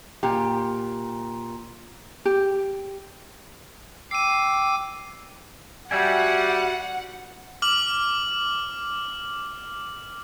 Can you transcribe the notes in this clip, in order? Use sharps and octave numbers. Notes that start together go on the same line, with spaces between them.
A#2 G4
G4
G5 D6 E6 C7 D#7
G3 F#4 E5 F#5 G#5
D6 F6 F#7